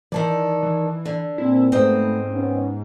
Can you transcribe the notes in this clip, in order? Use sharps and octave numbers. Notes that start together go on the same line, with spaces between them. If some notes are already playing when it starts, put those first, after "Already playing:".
D#3 E3 A4 D5
E3
D3
A#2 C4 E4
G#2 A3 B3 C4 D#5
B3 C#4